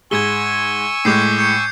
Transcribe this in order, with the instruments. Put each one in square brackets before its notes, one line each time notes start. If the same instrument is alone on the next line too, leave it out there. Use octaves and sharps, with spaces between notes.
[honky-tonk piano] G#2 G#4 [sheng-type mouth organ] G#5 C#6 E6 [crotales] G#6 G7
[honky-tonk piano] A2 G#3 [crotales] D6 G6 C7
[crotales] G6 C#7